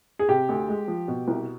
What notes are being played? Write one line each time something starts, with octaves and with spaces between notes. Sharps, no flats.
G#4
C3 G4
D2
G#3
F3
B2
C2